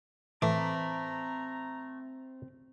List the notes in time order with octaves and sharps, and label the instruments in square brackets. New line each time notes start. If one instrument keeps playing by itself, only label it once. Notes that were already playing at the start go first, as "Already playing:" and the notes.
[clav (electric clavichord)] A2 E3 [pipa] A3 [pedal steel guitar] C4 B5 D6 [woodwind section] A#5